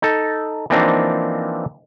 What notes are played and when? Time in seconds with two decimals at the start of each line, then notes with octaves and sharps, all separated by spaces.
0.02 D#4 A4
0.70 E3 F3 A#3 C4 D4 D#4